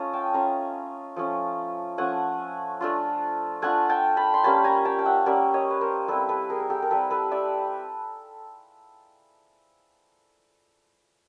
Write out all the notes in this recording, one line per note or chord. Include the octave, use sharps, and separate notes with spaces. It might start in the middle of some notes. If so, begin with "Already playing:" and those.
Already playing: A3 C#4 F4 C#5 D#5
G5 A5
A3 C#4 F4 G#5 A#5
F3 A3 C#4
F3 A3 C#4 F#5 G#5
A3 D4 F4
A3 D4 F4 F#5 G#5
G5 A5
A5 B5
C6
G3 A#3 C#4 A5 B5
G#5 A#5
G5 A5
G5
E5 F#5
G3 A#3 C#4 D5 E5
C#5 D#5
B4
A#4 C5
G3 C4 E4 A4 B4
A4 B4
G#4 A#4
A#4
G4 A4
A#4
G3 C4 E4 A4 B4
A4 B4
D5 E5